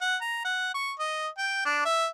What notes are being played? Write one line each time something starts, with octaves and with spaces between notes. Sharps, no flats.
F#5
A#5
F#5
C#6
D#5
G5
D4
E5